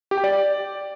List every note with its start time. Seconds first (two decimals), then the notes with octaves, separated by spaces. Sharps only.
0.11 G4
0.17 G5
0.24 D5